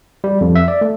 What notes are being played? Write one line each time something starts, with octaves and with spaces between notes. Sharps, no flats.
G3
F2
E5
D5
A3